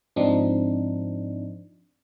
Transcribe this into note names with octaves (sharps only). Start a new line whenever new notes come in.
G#2 F3 C4 D4 D#4